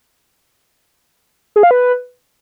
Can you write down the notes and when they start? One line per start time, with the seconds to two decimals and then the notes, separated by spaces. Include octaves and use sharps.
1.56 G#4
1.63 F5
1.71 B4